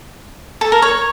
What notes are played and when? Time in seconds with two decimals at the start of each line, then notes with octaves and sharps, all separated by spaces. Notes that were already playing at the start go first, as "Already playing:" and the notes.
0.61 A4
0.72 A#4
0.82 C#5